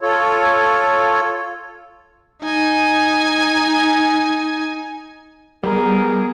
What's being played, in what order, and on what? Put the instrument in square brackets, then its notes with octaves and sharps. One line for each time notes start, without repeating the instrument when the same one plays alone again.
[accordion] F4 A4 C#5
[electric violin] D#4 G#5
[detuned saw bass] G3 [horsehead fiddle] B3 G#4 [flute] A#4